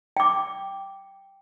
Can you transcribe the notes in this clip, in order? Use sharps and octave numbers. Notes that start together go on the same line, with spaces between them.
G5 D6